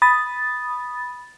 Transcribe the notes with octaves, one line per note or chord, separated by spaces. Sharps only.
B5 D#6 A6